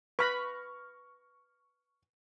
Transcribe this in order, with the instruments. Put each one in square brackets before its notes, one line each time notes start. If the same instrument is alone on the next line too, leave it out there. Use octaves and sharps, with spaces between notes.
[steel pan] B4 B5 [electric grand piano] C#6 F6 A#6